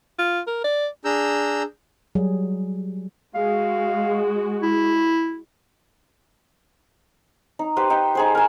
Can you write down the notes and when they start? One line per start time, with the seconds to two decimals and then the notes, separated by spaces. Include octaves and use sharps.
0.19 F4
0.47 A#4
0.64 D5
1.05 D4 G#4 A#5 E6 G6
2.15 F#3 G3 G#4
3.35 G#3 F#4 F5
4.62 E4
7.59 D#4
7.76 G4 B4 C5
7.90 D#4 G5
8.15 D#4 G#4 C5
8.35 A#4 G#5